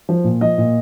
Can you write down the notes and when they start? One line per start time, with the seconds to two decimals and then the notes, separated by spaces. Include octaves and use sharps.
0.09 F3
0.24 A#2
0.41 F3 D#5
0.58 A#2